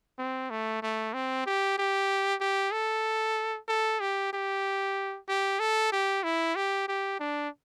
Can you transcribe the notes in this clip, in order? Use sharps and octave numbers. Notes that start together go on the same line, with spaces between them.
C4
A3
A3
C4
G4
G4
G4
A4
A4
G4
G4
G4
A4
G4
E4
G4
G4
D4